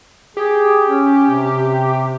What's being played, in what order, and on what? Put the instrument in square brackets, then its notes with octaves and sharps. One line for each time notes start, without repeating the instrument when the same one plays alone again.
[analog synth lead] G4 [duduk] G#4
[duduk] C#4
C3